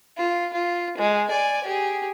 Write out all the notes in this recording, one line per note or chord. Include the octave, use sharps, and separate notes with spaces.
F4
F4
G#3
D5 G#5
G4 G#4